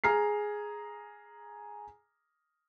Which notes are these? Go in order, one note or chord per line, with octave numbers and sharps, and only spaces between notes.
G#4 A#5 F6 C7